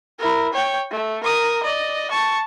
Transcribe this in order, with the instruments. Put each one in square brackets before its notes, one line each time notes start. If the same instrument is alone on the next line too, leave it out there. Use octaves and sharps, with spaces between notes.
[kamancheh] E4 A#4
C#5 G5
A3
A#4 D#6
D5 D#5
A5 C#6